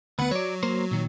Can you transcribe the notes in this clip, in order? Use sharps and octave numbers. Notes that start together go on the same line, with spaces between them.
D2 B3 B4 F#5
F#3 C#5 D5
A#3 A#4 C5
A#2 D#3